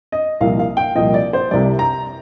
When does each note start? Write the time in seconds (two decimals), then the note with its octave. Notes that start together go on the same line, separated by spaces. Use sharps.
0.12 D#5
0.41 C2 A#2 F3 F5
0.59 F5
0.77 G5
0.95 C2 A#2 F3 D#5
1.14 D5
1.33 C5
1.51 C2 C3 G3 D5
1.79 A#5